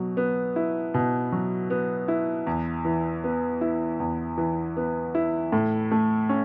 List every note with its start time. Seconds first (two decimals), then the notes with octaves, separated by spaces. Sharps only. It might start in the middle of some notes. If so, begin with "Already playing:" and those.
Already playing: B2 F#3
0.17 B3
0.56 E4
0.94 B2
1.32 F#3
1.70 B3
2.08 E4
2.47 E2
2.85 E3
3.24 B3
3.61 E4
4.00 E2
4.38 E3
4.77 B3
5.15 E4
5.52 A2
5.91 A3
6.29 C#4